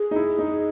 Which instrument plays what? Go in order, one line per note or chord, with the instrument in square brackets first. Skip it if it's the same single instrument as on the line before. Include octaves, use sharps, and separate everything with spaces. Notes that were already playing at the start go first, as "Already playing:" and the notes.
Already playing: [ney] G#4
[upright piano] D#4
E4
D#4